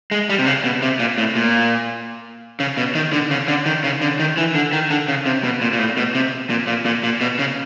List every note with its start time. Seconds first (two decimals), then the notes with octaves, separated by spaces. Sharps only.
0.11 G#3
0.30 G3
0.39 C3
0.47 C#3
0.64 B2
0.82 C3
0.99 A#2
1.18 A2
1.35 A#2
2.60 C#3
2.77 B2
2.95 D#3
3.12 D3
3.31 C#3
3.48 D3
3.66 D#3
3.84 C#3
4.01 D3
4.19 D#3
4.37 E3
4.55 D3
4.72 D#3
4.90 D3
5.08 C#3
5.26 C3
5.44 B2
5.61 A#2
5.73 A#2
5.79 A2
5.97 B2
6.15 C3
6.50 A#2
6.67 A#2
6.85 A#2
7.03 A#2
7.21 B2
7.39 C#3